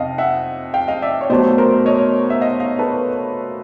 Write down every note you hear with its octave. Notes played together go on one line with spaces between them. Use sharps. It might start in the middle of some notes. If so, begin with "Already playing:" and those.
Already playing: F2 C3 D#5 F5
E5 F#5
F5 G5
D#5 F5
D5 E5
C#5
B2 F#3 A3 C5 D5
A#4 C5
C#5 D#5
E5
D#5 F5
D#5 F5
A4 B4